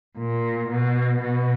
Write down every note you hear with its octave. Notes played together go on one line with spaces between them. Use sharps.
A#2
B2
B2